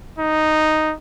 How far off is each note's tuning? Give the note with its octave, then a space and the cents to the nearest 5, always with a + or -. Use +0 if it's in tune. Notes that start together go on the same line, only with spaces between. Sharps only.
D#4 -5